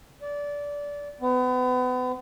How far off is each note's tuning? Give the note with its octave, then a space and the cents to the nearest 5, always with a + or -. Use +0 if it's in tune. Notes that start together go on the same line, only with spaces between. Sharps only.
D5 -20
B3 +35